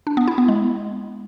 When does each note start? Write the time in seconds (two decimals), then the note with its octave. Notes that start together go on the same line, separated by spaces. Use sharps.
0.07 D4
0.17 B3
0.28 E4
0.38 B3
0.48 G#3